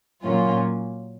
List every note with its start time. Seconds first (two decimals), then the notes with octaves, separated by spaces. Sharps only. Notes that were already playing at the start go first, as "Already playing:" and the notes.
0.23 A#2 F#3 A#3 C#4 F4